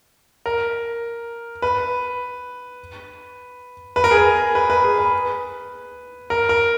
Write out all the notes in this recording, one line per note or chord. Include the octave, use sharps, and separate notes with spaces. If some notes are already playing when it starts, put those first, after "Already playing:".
A#4
B4
B4
A#4
G#4
A#4
B4
B4
G#4
B4
A#4
A#4